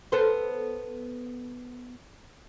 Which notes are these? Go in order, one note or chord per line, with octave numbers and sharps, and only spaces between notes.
B3 A4 C5